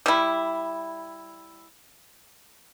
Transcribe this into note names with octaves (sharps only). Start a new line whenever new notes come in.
G3 E4